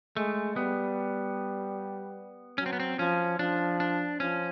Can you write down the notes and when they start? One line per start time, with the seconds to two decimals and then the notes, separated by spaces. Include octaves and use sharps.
0.16 G#3 A3
0.56 G3 B3
2.58 F#3 C#4
2.66 C4
2.73 B3
2.80 C4
2.98 F3 C#4
3.39 F3 D4
3.80 D4
4.20 F3 C#4